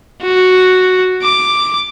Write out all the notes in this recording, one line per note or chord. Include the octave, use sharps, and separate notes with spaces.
F#4
D6